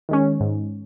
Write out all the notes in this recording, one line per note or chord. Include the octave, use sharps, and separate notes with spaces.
D#3 G#3 C#4
G#2